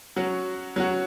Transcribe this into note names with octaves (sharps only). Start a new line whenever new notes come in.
F#3 C#4 F#4
F#3 C#4 F#4